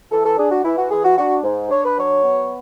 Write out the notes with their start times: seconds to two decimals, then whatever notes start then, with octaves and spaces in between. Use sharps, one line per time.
0.11 E3 A4
0.25 A4
0.37 D4 G#4
0.51 F#4
0.64 E3 E4
0.78 F#4
0.91 E3 G#4
1.04 F#4
1.18 D4 F#4
1.44 G#2
1.70 D4 C#5
1.85 B4
1.97 F#3 C#5
2.24 B3